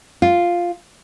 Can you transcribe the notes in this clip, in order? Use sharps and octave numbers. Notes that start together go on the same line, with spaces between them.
F4